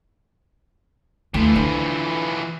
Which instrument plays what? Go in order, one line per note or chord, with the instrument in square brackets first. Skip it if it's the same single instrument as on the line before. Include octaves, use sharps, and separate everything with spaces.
[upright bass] D2 [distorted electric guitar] E3 F3
[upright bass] D3